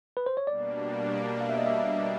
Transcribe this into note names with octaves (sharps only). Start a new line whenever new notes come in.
B4
C5
C#5
B2 G3 A#3 D4 D5
F5
E5
D#5
E5